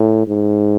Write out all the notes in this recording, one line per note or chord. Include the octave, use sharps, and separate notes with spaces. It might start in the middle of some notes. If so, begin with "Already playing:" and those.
Already playing: A2
G#2